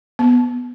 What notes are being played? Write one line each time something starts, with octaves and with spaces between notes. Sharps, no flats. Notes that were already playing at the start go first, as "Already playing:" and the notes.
B3